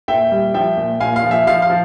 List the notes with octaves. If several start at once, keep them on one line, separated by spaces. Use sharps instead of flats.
A#2 E5 G5
G3
F3 E5 G5
A#2
A#2 F5 G#5
F5
F3
E5
F3 F5
F5
F3